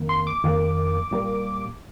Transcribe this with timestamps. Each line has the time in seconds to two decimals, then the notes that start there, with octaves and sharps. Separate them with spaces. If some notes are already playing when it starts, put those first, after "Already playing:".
Already playing: F2 D#3 A#3
0.09 C6
0.27 D6
0.44 F2 D#3 A#3
1.11 A#2 G3 A#3